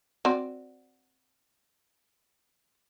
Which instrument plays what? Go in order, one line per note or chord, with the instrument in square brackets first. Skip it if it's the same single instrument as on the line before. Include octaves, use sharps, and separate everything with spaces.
[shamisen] C4 F#4 D5